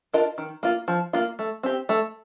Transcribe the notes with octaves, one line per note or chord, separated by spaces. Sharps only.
D4 F4 A#4 D#5
D#3
A#3 F4
F3
A#3 F4
A3
C4 G4
A3